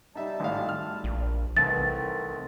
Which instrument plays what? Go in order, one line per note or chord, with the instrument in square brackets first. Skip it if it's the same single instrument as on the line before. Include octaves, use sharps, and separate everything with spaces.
[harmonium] G3 A5 [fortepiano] D#4 E5
[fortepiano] G#1 A2 F5
F6
[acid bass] A#1
[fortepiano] C2 [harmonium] D#3 A3 C4 [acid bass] E3 [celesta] A6